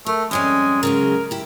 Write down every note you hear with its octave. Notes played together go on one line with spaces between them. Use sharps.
A3 A#4
F2 G3 G#3 C#4
C#3 F#3 G#3 A#4
E4 G4